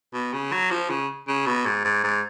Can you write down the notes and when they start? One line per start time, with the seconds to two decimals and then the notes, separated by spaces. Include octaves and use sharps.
0.14 B2
0.33 C#3
0.52 F#3
0.71 F3
0.90 C#3
1.28 C#3
1.47 B2
1.66 G#2
1.85 G#2
2.03 G#2